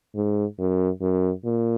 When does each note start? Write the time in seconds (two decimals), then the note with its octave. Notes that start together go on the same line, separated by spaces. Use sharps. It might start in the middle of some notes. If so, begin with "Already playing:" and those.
0.15 G#2
0.59 F#2
1.01 F#2
1.45 A#2